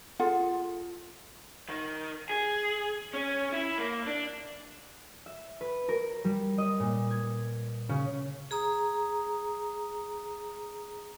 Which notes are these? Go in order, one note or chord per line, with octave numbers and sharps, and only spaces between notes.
F4 G#4 A4 F#5
D#3
G#4
C#4
E4
A#3
D4
E5
B4
A#4
G3
D#5
A#2
G#6
C#3
G#4 A#5 D#6